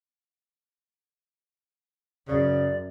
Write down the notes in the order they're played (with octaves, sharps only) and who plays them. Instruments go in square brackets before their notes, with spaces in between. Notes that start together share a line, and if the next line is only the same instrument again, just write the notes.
[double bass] F#2 [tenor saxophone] C#3 [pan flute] D5